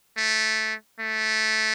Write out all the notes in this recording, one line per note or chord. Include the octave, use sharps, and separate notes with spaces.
A3
A3